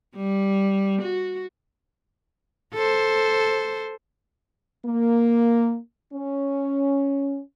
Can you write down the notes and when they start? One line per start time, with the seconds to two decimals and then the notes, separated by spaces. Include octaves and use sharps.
0.16 G3
1.02 F#4
2.74 A4 C5
4.85 A#3
6.14 C#4